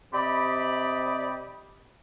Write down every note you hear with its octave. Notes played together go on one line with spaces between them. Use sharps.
C3 G4 D5 D#5 B5